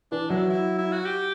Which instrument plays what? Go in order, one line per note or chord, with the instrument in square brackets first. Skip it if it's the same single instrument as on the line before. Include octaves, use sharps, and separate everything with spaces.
[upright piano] E3 [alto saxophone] D4
[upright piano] F#3 [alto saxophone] E4
[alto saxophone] E4
E4
F#4
G4